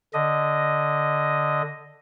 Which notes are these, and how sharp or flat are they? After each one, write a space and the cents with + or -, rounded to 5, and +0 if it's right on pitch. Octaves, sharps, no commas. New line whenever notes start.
D3 +0 D#5 +0